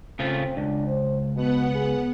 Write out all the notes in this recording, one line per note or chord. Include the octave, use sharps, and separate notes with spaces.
C#3 A3 C4 F4
C#2 D4
C5
B2 B3 F#5
G#4